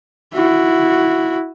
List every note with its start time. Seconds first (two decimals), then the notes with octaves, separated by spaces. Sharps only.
0.33 E4 F#4